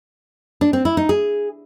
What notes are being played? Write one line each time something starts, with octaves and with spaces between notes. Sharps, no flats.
D4
C4
E4
D#4
G#4